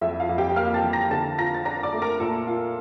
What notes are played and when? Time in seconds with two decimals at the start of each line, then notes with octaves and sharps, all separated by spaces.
0.01 F2 E4 E5
0.20 F4 F5
0.29 F2
0.38 G4 G5
0.56 A#3 F5 F6
0.74 A5 A6
0.84 E3
0.93 A#5 A#6
1.11 D3 A5 A6
1.38 F4 A#5 A#6
1.54 A6
1.65 D4 A#5 A#6
1.83 D5 D6
1.93 A3
2.02 A#4 A#5
2.20 A#2 A4 A5
2.47 F4